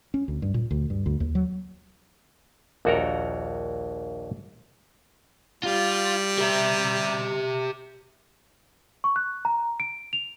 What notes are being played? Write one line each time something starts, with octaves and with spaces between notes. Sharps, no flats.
C#4
D2
G2
A#2
D2
G2
D2
D#2
F#3
A#1 D#2 F#4 A4 A#4 A#5
G3 F4
G4 E5
C#6
F#6
A#5
D7
F7